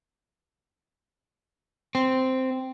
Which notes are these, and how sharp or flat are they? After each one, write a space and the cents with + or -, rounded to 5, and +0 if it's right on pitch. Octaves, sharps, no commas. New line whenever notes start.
C4 -5